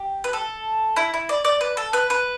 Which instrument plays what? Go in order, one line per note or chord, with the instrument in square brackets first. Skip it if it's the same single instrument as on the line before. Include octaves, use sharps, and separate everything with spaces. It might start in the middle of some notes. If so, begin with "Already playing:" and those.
Already playing: [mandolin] G4
B4
A4
E4
E4
D5
D5
B4
A4
B4
B4